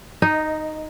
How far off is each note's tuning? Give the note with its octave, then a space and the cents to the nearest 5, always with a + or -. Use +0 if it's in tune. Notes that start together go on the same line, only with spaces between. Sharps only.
D#4 -5 D#5 +15